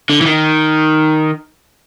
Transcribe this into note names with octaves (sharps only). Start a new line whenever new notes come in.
D3
E3
D#3